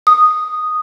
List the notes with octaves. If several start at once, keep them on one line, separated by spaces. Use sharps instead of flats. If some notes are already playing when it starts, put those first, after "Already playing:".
D#6